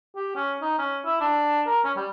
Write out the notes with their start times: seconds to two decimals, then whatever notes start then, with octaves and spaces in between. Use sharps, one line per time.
0.16 G4
0.36 C#4
0.62 D#4
0.79 C#4
1.05 E4
1.21 D4
1.67 A#4
1.84 C#4
1.97 G3